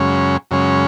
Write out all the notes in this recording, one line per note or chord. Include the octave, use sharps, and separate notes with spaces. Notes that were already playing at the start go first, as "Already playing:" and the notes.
Already playing: F#2 C#3 G#3 C#4
F#2 C#3 G#3 C#4